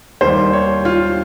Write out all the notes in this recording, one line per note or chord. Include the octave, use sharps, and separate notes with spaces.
D#2 D#3 G3 C5
C#5
F4